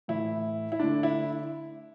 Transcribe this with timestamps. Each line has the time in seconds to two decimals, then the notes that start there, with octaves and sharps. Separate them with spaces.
0.08 A2 E3 A3 E4
0.72 E4
0.79 D3 A3 D4
1.03 E4